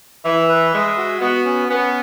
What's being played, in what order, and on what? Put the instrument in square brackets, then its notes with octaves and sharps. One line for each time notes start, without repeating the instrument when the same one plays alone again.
[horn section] E3 [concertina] E5
[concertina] B4
[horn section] G#3 [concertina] E5
[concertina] F#4
[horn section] B3 [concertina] F#4
[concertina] C#4
[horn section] B3 [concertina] C#4